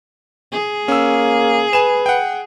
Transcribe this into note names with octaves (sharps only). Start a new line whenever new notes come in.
G#4
A#3 C#4 E6
B4 G#5 E7
F#5 G5